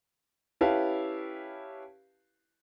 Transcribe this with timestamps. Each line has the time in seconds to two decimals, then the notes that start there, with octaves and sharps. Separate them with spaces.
0.61 C#4 E4 G4 B4 F5 A5